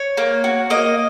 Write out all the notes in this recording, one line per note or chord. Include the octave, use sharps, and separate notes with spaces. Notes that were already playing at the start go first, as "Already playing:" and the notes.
Already playing: C#5
A#3
F#4
A#3 D#5